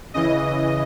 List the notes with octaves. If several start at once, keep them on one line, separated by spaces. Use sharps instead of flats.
C#3 E3 D#5